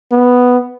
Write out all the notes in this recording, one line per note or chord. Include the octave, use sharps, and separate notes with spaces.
B3